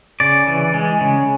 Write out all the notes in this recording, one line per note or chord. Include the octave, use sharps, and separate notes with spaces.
C#3 D5
E3
G#3
C#3